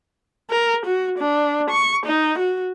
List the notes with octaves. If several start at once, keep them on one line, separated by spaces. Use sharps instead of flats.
A#4
F#4
D4
C#6
D#4
F#4